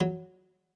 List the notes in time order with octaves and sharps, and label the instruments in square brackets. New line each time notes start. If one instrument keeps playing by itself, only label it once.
[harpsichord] F#3